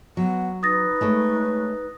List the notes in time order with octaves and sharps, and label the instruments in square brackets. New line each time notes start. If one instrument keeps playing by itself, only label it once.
[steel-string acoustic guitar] F#3 [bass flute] B3 [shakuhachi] F#5
[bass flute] D#4 [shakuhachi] B4 [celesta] D#6 A6 A#6
[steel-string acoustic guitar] G#3 A3 C#5